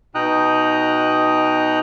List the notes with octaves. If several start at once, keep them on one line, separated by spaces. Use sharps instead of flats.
B2 D#4 G5 A#5 D#6 F#6